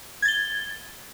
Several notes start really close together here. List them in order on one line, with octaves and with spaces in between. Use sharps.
G#6 A6 G7